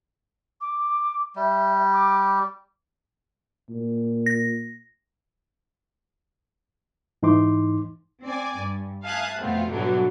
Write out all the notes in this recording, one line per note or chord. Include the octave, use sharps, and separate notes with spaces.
D6
G3 E5
D6
A#2
A#6
G#2 E3 D#4 C6 D6
C4 D5 G#5
G2
E5 F5 G#5 A5 D#6 F#6
F2 B2 A3 B3 C4 F4
G#2 B2 D3 E3 F#3 G3